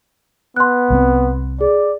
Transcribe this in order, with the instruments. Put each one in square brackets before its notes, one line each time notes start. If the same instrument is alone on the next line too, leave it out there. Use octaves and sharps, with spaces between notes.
[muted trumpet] B3 [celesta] C6 F#6
[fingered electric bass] C2 G3 C4
[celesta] G#4 [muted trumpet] D5